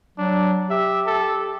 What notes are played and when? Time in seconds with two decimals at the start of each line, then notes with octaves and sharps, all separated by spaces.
0.18 F#3 D4
0.70 G4 E5
1.06 A4